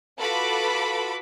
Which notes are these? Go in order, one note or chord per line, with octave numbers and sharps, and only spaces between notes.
F4 F#4 A4 B4 B5 D6